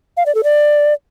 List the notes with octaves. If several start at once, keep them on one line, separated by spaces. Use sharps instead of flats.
F5
D5
A4
D5